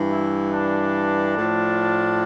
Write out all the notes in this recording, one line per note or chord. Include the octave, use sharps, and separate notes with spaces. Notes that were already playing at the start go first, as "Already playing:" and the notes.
Already playing: G2 E3
E4
D4
A2 F3